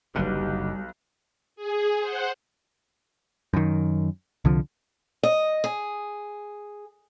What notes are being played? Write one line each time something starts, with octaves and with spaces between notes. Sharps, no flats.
F#1 B1 D3 G3 D#4 F#4 G4 B4
G#4
C5 F#5
F#2 D#3
C2 D3 F3
D#5
G#4